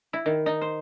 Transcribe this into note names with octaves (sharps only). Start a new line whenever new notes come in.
E4
D#3
D#4
C5